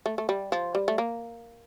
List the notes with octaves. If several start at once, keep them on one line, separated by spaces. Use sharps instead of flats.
A3
A3
G3
F3
G3
A3
A#3